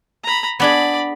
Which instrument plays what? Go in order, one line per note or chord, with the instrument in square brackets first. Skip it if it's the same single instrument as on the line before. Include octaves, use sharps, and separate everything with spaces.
[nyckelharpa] A#5 B5
[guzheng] B3 D4 G#4 [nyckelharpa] D5 B5